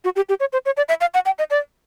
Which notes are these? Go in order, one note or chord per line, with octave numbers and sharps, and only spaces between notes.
F#4
G4
G4
C#5
C5
C#5
D5
E5
F5
F#5
G5
D#5
D5